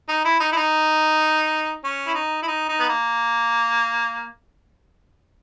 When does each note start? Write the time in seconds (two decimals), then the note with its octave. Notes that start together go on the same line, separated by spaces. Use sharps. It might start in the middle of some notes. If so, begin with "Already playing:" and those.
0.09 D#4
0.25 E4
0.40 D#4
0.52 E4
0.56 D#4
1.84 C#4
2.07 E4
2.15 D#4
2.42 E4
2.47 D#4
2.69 D#4
2.80 B3
2.89 A#3